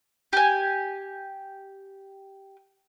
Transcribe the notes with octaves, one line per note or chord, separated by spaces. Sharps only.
G4 G#5